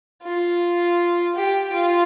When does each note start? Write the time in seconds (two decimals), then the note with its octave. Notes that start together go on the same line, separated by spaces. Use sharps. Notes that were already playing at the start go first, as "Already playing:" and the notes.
0.23 F4
1.35 G4
1.73 F4